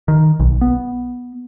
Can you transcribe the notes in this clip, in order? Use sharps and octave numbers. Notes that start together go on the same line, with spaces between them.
D#3
B1
B3